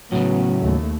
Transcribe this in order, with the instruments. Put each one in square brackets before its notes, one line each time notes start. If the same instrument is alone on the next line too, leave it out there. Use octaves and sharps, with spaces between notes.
[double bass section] E2 B3 C#4 [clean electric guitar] A2 C#3 [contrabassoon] F#3
[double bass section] D#2 A3